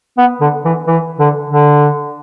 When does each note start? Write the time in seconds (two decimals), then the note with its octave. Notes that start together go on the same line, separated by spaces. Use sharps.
0.18 B3
0.40 D3
0.65 E3
0.87 E3
1.19 D3
1.50 D3